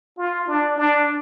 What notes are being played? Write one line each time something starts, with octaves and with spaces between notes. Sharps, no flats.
F4
D4
D4